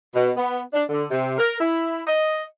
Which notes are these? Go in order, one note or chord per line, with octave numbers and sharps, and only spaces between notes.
B2
B3
D4
D3
C3
A#4
E4
D#5